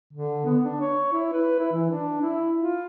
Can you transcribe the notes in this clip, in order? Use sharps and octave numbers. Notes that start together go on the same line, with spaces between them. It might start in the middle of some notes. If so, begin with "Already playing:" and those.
D3
B3
D4
C#5
E4
B4
E4
E3
D4
E4
F4